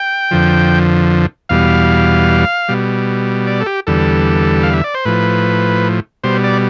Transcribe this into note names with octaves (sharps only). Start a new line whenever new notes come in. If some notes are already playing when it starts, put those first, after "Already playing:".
Already playing: G5
F2 D3 F3
E2 B2 G3 F5
B2 G3
D5
A4
G4
E2 D3 G3 A4
F5
E5
D5
C5
A2 F3 B4
B2 G3 C5
D5